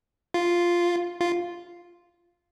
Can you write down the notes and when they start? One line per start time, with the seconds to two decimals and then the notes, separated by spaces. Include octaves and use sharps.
0.34 F4
1.21 F4